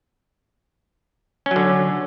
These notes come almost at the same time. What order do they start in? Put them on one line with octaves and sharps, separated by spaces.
C#4 F#3 D3